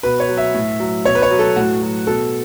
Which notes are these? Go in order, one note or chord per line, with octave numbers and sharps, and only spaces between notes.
B2 B4
C#5
F#3
E5
A2
F#3
B2 C#5
B4
C#5
F#3
A4
A2 F#4
F#3
B2 A4